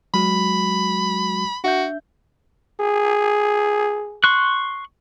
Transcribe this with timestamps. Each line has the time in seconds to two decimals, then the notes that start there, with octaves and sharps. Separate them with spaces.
0.14 F#3 G#3 F#4 B5
1.64 D4 F#4 E5 G6
2.80 G#4
4.24 C6 C#6 F#6